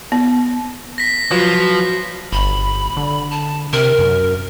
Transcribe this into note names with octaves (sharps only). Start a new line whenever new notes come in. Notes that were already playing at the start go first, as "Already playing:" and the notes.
B3
A#6 B6
F3 F#3 F4 F#4 B4
G1 B5
D3
A5
C3 A#4
F#2